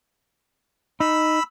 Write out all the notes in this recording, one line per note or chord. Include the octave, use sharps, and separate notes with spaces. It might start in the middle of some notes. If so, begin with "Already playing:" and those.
D#4 B5 E6